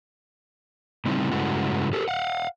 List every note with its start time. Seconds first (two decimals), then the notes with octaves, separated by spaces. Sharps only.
1.06 A2 C#3 G3 C4 D#4 E4
1.31 G2 C#3 G#3 A3 E4 F#4
1.93 G4 A4 A#4
2.08 F5 F#5